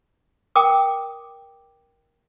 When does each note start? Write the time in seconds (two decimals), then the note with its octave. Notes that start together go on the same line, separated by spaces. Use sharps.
0.56 A#4 G5 D6 D#6